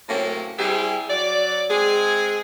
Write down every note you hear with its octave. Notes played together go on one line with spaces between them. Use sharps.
A2 C3 F#3 A#3 C#4
G3 C4 E4 G4 G#4
F#3 D5
G#3 C4 G#4